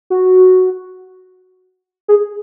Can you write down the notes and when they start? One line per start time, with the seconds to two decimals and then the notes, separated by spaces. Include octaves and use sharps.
0.10 F#4
2.08 G#4